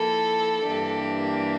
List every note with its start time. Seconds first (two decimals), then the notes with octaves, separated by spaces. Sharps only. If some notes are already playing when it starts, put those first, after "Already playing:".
Already playing: F3 A#3 E4 A4
0.63 G2 E3 A#3 D4 G4